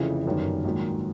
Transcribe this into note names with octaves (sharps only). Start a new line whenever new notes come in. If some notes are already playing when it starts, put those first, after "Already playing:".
Already playing: F1 F2 C#3 E3
G1 F#2 D#3 G3
A#1 G#2 D#3 F#3